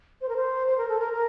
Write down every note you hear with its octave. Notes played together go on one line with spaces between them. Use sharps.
C5
A#4
C5
C5
A#4
A4
A#4
A#4